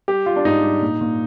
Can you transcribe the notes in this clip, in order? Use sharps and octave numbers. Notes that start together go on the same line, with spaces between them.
G3 G4
G3 F4
D4
G#2 D#4
G3
A#2
A#2